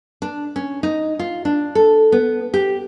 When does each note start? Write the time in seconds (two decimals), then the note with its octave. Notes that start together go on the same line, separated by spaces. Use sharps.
0.22 D4
0.56 C#4
0.83 D#4
1.19 F4
1.45 D4
1.75 A4
2.12 B3
2.54 G4